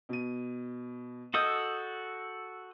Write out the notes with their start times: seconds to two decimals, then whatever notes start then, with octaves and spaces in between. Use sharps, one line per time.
0.09 B2 D#7
1.34 F#4 A4 D#5 D#6 E6 G6